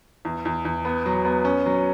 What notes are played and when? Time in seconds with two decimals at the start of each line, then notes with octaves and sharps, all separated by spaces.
0.25 E2
0.45 E2
0.65 E2
0.85 B3
1.06 F#3
1.25 B3
1.45 C#4
1.66 F#3